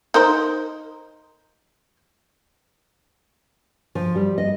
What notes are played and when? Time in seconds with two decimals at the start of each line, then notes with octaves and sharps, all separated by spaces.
0.14 D#4 A#4 C5
3.95 F3
4.16 G3
4.38 D#5